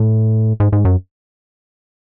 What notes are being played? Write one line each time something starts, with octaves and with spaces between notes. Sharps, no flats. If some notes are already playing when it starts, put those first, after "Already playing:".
Already playing: A2
G#2
G#2
F#2